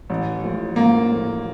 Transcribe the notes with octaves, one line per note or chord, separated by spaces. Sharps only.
A1
A2 F3
A1 A#3
A2 F3